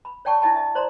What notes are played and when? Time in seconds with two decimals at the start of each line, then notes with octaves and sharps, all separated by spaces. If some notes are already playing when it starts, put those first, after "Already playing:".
0.05 B5
0.25 C#5 D5 G5 A5 C#6
0.41 D4 E4 D#5 G5 A5 B5
0.55 D#5 E5
0.75 C5 D5 A#5 C6